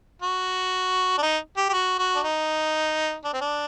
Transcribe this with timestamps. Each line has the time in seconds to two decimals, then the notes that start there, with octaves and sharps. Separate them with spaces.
0.22 F#4
1.18 D4
1.22 D#4
1.57 G4
1.69 G4
1.73 F#4
1.98 F#4
2.15 D4
2.23 D#4
3.24 D4
3.33 C4
3.41 D4